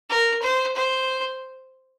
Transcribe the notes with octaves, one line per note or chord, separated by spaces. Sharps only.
A#4
C5
C5